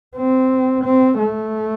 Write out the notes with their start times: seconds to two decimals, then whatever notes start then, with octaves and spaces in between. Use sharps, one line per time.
0.17 C4
0.85 C4
1.18 A3